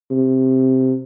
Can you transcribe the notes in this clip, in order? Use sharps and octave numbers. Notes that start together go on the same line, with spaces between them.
C3